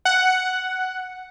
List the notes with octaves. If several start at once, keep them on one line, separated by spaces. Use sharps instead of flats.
F#5